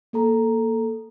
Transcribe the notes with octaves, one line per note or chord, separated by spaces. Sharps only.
A#3 A4 A#5